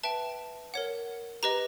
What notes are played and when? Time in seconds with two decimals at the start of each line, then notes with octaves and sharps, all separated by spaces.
0.03 B4 E5 G5 A5
0.74 A#4 C#5 F#5
1.43 G4 B4 D#5 A#5